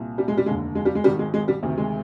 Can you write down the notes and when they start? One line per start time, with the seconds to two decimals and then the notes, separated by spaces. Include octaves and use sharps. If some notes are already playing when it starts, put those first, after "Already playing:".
Already playing: C2 A#2
0.18 G3
0.28 G#3
0.37 G3
0.46 F1 D#2 D3 G#3
0.75 G#3
0.85 G3
0.95 G#3
1.04 G#1 G#2 D#3 G3
1.19 G#3
1.34 G#3
1.48 G3
1.62 D2 C3 D#3
1.78 G#3